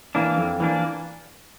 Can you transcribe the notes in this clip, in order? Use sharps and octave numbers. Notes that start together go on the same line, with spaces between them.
E3 A#3 D4
F2
E3 A#3 D4